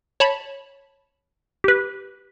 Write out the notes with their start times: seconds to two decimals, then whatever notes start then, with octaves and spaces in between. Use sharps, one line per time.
0.20 C#5 A5 B5
1.64 G4 B4